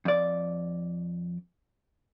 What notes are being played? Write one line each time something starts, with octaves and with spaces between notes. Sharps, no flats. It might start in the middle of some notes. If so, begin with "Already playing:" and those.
F2 D5